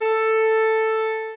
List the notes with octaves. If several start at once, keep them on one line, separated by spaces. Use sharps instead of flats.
A4